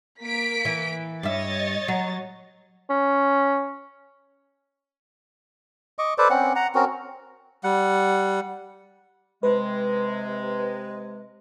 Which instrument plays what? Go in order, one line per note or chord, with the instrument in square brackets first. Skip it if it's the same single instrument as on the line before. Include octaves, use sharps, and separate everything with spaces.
[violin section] A#3 B6 D7
[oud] E3
[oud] G2 E5 [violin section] C#5 D#5 A6
[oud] F#3
[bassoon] C#4
[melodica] D#5 C#6 D6
A4 B4 C5 D5
C4 C#4 F#5
F#5 A#5
C4 C#4 F#4 A#4
G3 F#5
[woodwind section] C3 G#3 [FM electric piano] B4